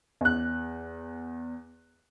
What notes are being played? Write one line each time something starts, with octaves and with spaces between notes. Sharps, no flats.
E2 F#6